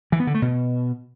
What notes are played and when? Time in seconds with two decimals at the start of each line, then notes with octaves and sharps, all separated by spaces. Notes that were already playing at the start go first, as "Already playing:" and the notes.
0.12 E3
0.20 B3
0.27 D3
0.34 A3
0.42 B2